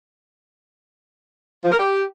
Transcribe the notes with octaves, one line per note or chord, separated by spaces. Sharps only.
F3
A#4
G4